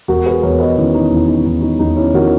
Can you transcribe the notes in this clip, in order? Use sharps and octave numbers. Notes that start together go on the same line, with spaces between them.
E1 F#4 A#4
G#4 B4
E2 A#4 C#5
B4 D#5
D#3 C#4 E4
D#4
E1 C#4 E4
E4
D#4
E1 D#4
D#4
E2 D#4
C#4 E4
D#3 F#4 A#4